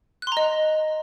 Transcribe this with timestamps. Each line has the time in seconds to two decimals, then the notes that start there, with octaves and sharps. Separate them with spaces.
0.22 F#6
0.27 C6
0.32 A#5
0.37 D#5